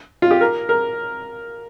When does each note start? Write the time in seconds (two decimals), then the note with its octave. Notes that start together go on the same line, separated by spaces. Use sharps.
0.22 F4
0.31 G4
0.41 A#4
0.69 A#4